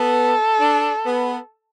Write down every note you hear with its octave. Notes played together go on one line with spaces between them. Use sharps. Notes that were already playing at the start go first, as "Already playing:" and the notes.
Already playing: B3 A4
D4
B3